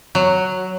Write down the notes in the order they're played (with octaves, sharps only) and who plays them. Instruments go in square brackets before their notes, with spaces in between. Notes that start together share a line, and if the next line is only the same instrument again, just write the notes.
[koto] F#3